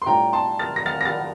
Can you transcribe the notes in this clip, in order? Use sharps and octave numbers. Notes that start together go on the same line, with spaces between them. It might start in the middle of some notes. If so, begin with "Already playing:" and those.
C6
A2 G3 D4 F4 G5 A#5
A5 C6
F6 A6
A#6
F6 A6
A#6
F6 A6